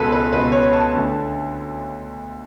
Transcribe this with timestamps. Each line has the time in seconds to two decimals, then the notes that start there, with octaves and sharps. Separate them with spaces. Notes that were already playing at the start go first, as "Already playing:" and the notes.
Already playing: C#2 B2 G#4 A4 B4
0.12 B4
0.32 C#2 B2 B4
0.52 C#5
0.73 A5
0.93 D2 D3